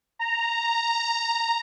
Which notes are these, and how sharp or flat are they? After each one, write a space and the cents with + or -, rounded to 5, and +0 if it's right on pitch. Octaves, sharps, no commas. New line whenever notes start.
A#5 -10